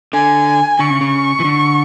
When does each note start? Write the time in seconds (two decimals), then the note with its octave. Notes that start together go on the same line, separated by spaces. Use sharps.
0.13 D3 G#5
0.79 D3 C#6
0.90 C#3
1.01 C#3
1.40 E3
1.44 D3